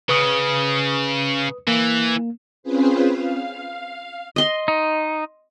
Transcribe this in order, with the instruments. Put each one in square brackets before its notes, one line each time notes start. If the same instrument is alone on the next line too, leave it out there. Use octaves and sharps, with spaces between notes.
[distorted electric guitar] C#3 [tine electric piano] B4 D#6
[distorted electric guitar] E3 [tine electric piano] A#3
[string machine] C4 C#4 F4 G#4 B4 C5
F5
[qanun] D#5 C6
[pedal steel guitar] D#4